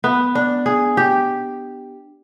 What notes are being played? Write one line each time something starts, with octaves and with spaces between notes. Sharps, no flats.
B3
D4
G#4
G4